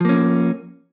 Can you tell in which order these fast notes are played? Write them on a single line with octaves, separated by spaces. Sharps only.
F3 A#3 C#4